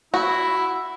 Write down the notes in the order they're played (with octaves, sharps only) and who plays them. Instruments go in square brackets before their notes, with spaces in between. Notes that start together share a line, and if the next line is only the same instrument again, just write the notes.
[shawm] E4 [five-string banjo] F#4